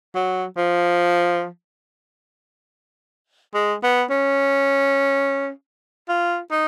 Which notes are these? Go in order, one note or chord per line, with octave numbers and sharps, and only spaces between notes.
F#3
F3
G#3
B3
C#4
F4
D#4